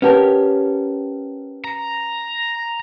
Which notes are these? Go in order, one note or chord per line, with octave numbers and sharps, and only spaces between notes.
C#4 G4 A#4 B4 F#5 A5
A#5